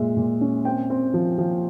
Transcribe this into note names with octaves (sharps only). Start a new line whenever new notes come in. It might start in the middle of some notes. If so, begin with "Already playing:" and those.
Already playing: A#2 G#3 E5
A#2
C#4
C4 G5
C4
F3
F3